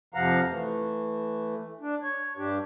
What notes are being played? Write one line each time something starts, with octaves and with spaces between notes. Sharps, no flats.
F2 C3 F3 F5 F#5 A#5
E3 A3
D4
C#5
G2 D4 G4